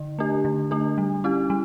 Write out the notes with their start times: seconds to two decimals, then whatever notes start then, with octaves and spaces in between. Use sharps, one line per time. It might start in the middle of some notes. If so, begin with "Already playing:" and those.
Already playing: D3
0.19 A3 D4 G4
0.45 D3
0.71 A3 D4 G4
0.98 G3
1.24 C#4 E4 G4
1.50 G3